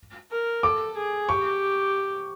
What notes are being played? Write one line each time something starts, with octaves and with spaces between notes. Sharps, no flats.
A#4
A4 D6
G#4
G4 C#6